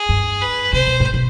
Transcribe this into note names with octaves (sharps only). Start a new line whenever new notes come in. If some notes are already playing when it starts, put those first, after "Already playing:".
Already playing: G#4
G2
B4
C3 C5
B2
G#2
B2